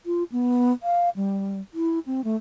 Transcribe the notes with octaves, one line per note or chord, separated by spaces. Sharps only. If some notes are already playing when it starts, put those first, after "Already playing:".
F4
B3
F5
G3
E4
C4
A3